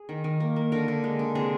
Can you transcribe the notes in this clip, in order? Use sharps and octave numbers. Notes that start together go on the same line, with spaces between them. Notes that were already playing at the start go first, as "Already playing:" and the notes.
Already playing: G#4
D#3
D#3
A#3
A#3
D3 A#4
D3
G#3
D3
C3 G#4